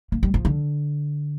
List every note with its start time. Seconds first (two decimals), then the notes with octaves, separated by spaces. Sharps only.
0.12 A#3
0.23 G3
0.34 F3
0.45 D3